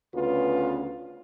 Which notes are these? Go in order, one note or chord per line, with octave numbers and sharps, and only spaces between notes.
D2 C#3 B3 C#4 F4 B4